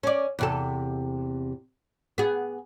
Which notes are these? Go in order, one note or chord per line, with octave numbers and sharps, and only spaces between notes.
C#4 D5
E2 C3 A4
B3 G#4